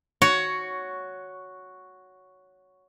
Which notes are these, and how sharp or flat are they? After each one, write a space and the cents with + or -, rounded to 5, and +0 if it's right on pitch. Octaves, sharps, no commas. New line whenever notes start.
F#4 +0 C#5 +10